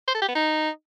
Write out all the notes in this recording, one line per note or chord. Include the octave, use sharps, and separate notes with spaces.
C5
A4
G4
B3
D#4